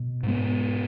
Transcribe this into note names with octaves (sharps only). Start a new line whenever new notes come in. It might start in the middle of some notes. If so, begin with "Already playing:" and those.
Already playing: B2
G#2 G#3 B3